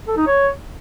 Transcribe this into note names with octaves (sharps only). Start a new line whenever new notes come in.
A4
D#4
C#5